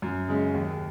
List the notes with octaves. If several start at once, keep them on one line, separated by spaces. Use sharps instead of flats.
F#2
C#3 G#3 C#4
D#2